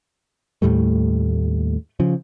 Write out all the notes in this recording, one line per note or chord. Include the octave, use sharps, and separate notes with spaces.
D#2 A2 G3 A3
C#3 F3